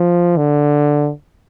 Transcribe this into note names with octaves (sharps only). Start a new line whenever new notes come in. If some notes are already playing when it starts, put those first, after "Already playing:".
Already playing: F3
D3